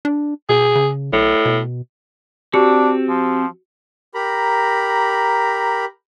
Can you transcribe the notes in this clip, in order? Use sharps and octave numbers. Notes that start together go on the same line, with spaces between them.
D4
B2 G#4
C#3
B1 A2
B2
C4 D4 F#4 G4 C#7
F3
G4 A#4 A#5 B5